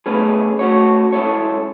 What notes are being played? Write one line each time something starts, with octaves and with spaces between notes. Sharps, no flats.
B2 A3 C#4 G#4 B4
A3 C#4 F#4 C#5
G#3 C#4 E4 A4 C#5